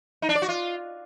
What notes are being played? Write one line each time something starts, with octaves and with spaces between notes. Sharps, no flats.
D#4
D4
D5
F#4
F4